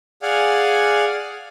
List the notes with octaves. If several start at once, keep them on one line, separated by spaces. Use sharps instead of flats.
G#4 D5 F5 F#5 G#5